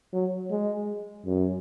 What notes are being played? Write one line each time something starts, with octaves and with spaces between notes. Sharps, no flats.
F#3
G#3
F#2